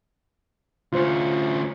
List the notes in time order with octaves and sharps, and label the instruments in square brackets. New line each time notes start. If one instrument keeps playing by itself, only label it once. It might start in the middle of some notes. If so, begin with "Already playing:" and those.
[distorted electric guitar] D2 C#4 [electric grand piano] F4 C5